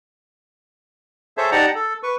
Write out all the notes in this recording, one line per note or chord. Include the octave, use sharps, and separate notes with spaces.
G#4 A4 C5 C#5 E5 A5
D#4 G4 D5 F#5 A5 A#5
A4
B4 C#6